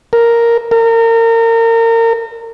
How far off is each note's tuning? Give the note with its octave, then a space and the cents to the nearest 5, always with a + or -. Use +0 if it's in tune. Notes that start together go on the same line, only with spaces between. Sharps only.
A#4 +0
A#4 -30